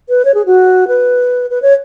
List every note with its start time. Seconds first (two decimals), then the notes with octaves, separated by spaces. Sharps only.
0.09 B4
0.25 C#5
0.34 G#4
0.46 F#4
0.88 B4
1.50 B4
1.62 C#5